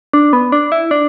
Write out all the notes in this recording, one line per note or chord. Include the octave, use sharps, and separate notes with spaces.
D4
B3
D4
E4
D4